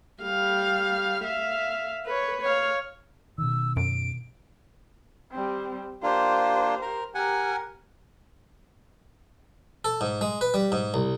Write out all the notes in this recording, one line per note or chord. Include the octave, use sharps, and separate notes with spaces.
G3 F5
E5 F5
B4 C#5
C#5 F5
B2 D#3 E6
F#2 D7
G3 C4
A#3 D4 F4 G4 C5
A#4
G4 A#4 F#5 G#5
A4
G#2
G#3
B4
G3
G#2
C2